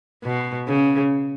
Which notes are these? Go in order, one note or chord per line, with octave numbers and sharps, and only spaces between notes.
B2
C#3